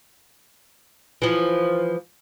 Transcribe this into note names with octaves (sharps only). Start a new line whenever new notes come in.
E3 F3